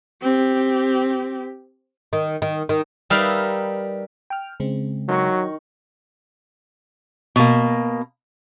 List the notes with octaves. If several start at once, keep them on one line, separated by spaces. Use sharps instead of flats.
C4 G4
D#3
D#3
D#3
G3 D#4 A#4 B4 E5 F5
G5 F6
C#3 G#3 C4
D#3 F#3 C#6
B2 A#3